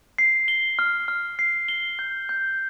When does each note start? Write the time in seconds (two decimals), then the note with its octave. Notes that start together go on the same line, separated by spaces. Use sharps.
0.18 C7
0.48 G7
0.79 F6
1.08 F6
1.39 C7
1.68 G7
1.99 G6
2.29 G6